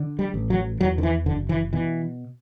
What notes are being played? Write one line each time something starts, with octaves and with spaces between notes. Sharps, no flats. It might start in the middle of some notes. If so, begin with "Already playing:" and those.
Already playing: D3
G3
A1
F#3
E2 F#3
D3
E3
F#1 D3
E3
B2 E3